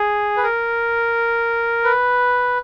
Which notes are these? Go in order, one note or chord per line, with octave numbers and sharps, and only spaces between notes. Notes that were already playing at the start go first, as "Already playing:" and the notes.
Already playing: G#4
B4
A#4
B4